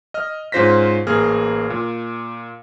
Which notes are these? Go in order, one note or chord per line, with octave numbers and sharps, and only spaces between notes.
D#5 F6
G#2 C#4 F4 C5 A#6 B6
A1 A#3 G#4 F6
A#2